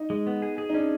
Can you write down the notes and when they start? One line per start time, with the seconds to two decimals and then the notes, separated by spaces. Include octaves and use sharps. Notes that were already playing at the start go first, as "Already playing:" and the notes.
Already playing: D#4
0.10 G#3
0.27 B3
0.42 G#4
0.58 G#4
0.69 D#4
0.74 C#4 D4